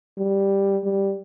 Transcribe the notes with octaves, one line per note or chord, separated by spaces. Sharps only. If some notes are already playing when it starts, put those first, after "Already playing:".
G3
G3